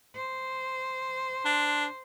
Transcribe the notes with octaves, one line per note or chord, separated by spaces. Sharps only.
C5
D4